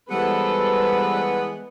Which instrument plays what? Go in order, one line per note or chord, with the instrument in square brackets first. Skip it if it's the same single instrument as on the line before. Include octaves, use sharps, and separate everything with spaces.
[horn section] E3 G#3 B3 [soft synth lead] G3 [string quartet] A4 C5 D5 [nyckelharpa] B4